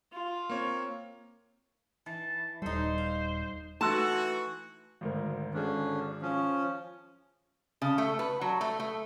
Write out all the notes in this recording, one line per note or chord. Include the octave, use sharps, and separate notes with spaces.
F4
A#3 C4 C#5
E3 A5
D#1 G3 D#4 A4 C5
F5
E3 A3 D#4 F#4 A5 C6 E6
G#1 D2 A#4
G#1 D3 C#4 D4 G#4
F3 C#4
C#3
A3
B4
F#3
A3
A3